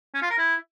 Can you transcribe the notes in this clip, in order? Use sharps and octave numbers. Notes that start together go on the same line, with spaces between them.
C#4
F4
A#4
E4